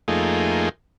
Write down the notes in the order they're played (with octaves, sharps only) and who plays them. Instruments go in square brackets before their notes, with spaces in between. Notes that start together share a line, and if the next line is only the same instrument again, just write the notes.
[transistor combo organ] F2 A3 A#3 D#4 F4 G#4